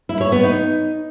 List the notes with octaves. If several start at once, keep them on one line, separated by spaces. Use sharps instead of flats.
E4
C#5
B3
D#4